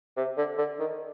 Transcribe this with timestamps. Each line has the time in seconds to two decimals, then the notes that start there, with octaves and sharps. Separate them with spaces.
0.17 C3
0.38 D3
0.58 D3
0.80 D#3